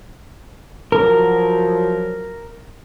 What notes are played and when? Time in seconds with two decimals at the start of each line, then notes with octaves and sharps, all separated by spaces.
0.92 F3 F#3 A#4